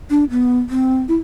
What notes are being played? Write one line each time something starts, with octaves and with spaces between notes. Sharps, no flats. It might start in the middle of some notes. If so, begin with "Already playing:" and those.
D4
B3
C4
E4